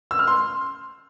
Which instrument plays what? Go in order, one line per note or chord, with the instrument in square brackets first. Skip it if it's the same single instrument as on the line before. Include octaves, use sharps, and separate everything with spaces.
[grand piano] E6
F6
C6